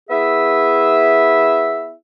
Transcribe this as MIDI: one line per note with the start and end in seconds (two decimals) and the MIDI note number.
0.09 1.93 59
0.09 1.93 64
0.09 1.93 68
0.09 1.93 76